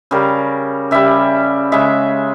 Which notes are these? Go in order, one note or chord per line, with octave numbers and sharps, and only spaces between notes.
C#3 G3 A#4
C#3 G3 E5
C#3 G#3 E5